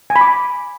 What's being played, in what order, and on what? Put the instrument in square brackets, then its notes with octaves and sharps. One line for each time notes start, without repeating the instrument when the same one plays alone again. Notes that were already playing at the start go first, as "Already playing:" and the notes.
[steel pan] G#5
B5
D6